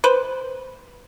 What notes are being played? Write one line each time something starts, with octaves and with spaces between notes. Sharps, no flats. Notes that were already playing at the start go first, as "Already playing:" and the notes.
B4 C5